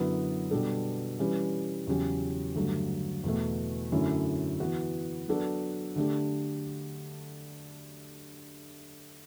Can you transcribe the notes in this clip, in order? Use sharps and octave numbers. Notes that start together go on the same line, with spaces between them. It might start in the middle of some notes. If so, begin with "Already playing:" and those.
Already playing: F#2 D3 F#3 B3 E4
B2 G3 D4 A4
E3 G3 C#4 G4 B4
E2 C#3 F#3 C#4 G4
G2 D3 F#3 A3
E2 B2 A3
F#2 D3 A3 C#4 E4
E3 B3 F#4 B4
F#3 B3 D4 F#4 A4
D3 A3 D4 G4